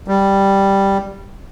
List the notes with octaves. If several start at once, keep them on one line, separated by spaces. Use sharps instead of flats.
G3